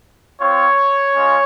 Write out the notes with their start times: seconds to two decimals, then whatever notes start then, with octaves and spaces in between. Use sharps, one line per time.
0.40 C4 F4 C#5
1.13 G#3 C#4 F4